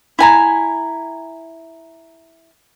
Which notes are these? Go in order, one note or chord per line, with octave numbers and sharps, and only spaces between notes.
E4 G#5 A#5